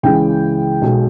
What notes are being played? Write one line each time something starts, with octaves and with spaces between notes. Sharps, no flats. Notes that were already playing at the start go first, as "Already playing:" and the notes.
C#2 C#3 E3 G#3 G5
B1 B2 G#3